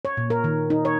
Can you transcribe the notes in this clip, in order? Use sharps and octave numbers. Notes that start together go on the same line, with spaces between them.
C#5
A#2
A#4
D#3
D#4
C#5